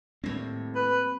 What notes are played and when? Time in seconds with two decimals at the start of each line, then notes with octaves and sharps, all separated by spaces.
0.24 D#2 A2 G3 A#3 C4
0.75 B4